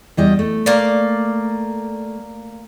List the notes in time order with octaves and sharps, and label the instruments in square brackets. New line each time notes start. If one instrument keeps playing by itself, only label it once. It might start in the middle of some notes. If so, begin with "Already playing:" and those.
[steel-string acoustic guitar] E2 G3 D#5
A3
[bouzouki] A#3 D5